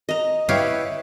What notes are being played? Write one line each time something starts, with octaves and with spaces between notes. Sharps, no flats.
D#5 A#5
E4 G4 B4 C#5 F5